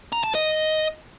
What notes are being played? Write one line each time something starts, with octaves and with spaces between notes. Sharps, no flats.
A#5
A5
D#5